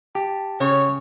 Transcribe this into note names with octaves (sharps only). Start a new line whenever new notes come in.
G4 A5
C#3 C#5 C#6